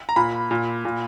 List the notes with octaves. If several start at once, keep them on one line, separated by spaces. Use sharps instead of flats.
A#5
A#2 B5
A#2
A#2